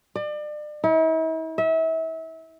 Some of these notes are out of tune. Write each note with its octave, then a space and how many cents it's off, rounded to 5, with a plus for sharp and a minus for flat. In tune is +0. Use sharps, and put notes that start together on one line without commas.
D5 +35
E4 -45
E5 -30